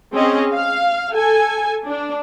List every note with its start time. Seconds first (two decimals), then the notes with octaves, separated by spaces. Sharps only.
0.14 C4 C#4 G#4 D#5
0.52 F5
1.13 A4 G#5
1.88 D4